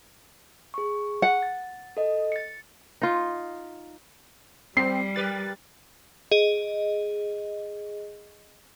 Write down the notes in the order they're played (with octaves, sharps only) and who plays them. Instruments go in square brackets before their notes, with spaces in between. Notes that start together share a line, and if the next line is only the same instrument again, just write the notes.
[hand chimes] G#4 C#6
[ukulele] F#5
[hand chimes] A6
A4 D#5
A6 C#7
[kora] D#4 F4
[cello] G3 [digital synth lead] C4 [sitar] G4 [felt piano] C7
[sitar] G4 A#4 B4 [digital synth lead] A6
[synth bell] G#4 D#5